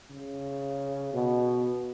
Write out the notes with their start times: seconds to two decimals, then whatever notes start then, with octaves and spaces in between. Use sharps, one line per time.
0.11 C#3
1.13 B2